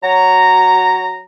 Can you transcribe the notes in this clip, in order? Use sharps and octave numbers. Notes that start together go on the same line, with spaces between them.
F#3 F#4 C#5 A#5